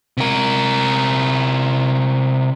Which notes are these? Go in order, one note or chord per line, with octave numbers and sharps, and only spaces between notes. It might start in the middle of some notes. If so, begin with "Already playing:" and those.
C3 A#4